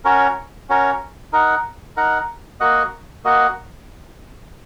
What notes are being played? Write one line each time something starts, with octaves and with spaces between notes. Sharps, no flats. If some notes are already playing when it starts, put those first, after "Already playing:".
C#4 F#4 A#4 C#5
C#4 F#4 A#4 C#5
D#4 A#4 F#5
D#4 A#4 F#5
A#3 F#4 D#5 F#5
A#3 F#4 D#5 F#5